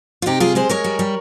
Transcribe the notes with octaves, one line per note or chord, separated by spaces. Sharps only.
F4
C3 D#4 G4
G3 F4 G#4
G#3 G#4 C5
G#3 A#4 C#5
G3
G3